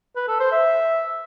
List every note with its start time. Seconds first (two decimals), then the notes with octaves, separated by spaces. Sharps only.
0.16 B4
0.28 A4
0.40 C5
0.52 E5